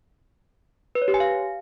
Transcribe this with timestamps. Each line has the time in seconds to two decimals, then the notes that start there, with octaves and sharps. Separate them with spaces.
0.95 B4
1.02 C#5
1.08 G4
1.14 G#5
1.20 F5